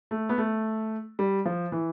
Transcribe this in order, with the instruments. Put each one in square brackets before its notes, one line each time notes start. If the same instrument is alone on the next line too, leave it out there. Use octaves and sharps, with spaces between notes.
[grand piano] A3
B3
A3
G3
F3
E3